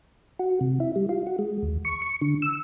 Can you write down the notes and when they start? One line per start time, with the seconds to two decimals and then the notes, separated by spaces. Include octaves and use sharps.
0.39 F#4
0.61 C3
0.80 E4
0.96 G3
1.09 F4
1.27 F#4
1.39 G#3
1.62 D#2
1.85 C#6
2.02 C#6
2.22 D3
2.42 E6